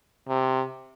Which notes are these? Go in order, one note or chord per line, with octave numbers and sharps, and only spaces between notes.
C3